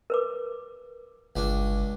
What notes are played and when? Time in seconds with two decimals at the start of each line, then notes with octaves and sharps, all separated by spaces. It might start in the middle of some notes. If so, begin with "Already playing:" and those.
0.10 A#4 B4 D6
1.36 G1 C#2 D4